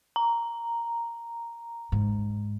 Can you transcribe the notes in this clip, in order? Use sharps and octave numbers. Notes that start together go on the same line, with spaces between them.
A#5
G#2